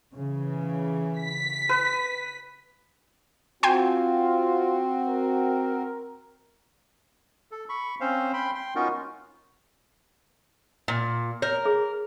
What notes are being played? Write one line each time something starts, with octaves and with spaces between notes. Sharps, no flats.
C#3 E3
B6
B4
C4 F4 F#4 G5 G#5 C6
A#4
A4
B5 C#6
C4 C#4 C5 F5
G5 B5 C6
G5 C6
B3 C#4 D#4 F4 F#4 A#4
A#2
A#4 C#5
G#4